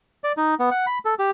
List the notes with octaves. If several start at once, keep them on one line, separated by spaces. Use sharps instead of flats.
D5
D#4
B3
F#5
B5
A4
G4